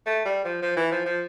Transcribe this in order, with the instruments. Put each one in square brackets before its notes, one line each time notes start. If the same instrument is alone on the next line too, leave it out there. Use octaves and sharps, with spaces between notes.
[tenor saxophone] A3
G3
F3
F3
E3
F3
F3